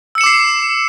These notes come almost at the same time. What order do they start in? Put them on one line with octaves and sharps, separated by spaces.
E6 C#7 E7 D6 C7